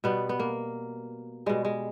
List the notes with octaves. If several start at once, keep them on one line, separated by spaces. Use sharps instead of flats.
B2 G3 B3
B3
A#3
B2 G3 G#3
G#3